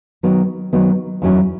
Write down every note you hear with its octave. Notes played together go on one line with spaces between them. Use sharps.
D#3 F#3 B3
D#3 F#3 B3
E2 D#3 F#3 C#4 E4